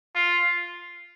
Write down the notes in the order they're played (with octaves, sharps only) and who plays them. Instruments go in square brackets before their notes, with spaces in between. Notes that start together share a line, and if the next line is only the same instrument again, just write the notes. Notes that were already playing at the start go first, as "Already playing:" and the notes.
[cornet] F4